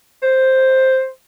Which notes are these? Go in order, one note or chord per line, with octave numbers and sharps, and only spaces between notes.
C5